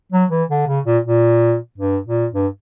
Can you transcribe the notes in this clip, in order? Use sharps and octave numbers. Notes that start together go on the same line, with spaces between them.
F#3
E3
D3
C#3
A#2
A#2
G2
A#2
G2